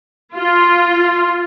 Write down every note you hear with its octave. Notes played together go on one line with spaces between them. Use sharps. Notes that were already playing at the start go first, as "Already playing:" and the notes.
F4